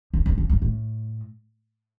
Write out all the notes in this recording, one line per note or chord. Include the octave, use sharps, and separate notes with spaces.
E2
E2
F2
G2
A2